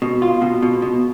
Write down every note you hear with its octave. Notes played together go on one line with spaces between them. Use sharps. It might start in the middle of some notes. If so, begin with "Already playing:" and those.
B2
F4
B2
B2
B2